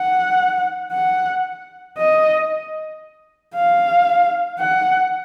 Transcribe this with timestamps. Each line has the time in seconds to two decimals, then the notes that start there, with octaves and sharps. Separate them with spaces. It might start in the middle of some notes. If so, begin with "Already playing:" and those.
Already playing: F#5
0.93 F#5
1.98 D#5
3.55 F5
4.59 F#5